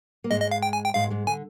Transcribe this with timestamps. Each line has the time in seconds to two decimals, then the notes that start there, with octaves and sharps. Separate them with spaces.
0.24 A#3
0.30 G#2 G#3 D#5
0.41 D#5
0.51 F5
0.63 G5
0.73 G#5
0.84 G5
0.94 G#2 G#3 F5
1.10 G#2 G#3
1.27 D3 G#5